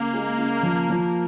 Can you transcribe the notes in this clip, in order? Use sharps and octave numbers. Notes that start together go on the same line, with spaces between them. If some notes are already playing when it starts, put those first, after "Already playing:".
Already playing: C#3 A#3
G#3
C#3
F3
F3